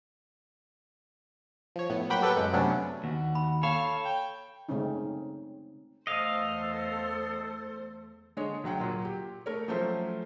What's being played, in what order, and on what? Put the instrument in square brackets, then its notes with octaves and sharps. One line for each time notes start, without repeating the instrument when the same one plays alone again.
[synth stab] F3 C#5
A2 B3
F#3 A#3 F#5 G5 B5
G4 A4 B4 F#5 G5
F#2 C#3 G#3
C3 F#3 A3 B3 C#4 D4
[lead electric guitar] D#2 [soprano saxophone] F#4
[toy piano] B5
[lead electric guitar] A4 C#5 [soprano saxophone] F5 [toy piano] B5
[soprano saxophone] G5
[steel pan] C#3 G#3 A3 C4 C#4 D#4
[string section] E2 A3 C5 [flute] A4 [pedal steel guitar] D#5 F5
[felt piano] D3 G#3 G#4 C#5
D2 F#3 F#5 G5
A#2 F#3
G4
A3 A#4 C#5
F3 F#3 A3 C#4 C5 E5